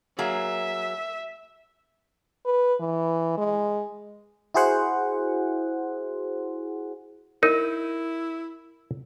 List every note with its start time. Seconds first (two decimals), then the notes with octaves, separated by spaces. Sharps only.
0.19 F#3 A#3 G#4 E5
2.46 B4
2.80 E3
3.38 G#3
4.54 E4 F#4 G#4 C5 F#5
7.43 D#4 E4 A#4